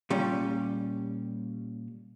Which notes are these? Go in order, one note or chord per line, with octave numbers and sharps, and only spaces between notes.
A#2 G3 C#4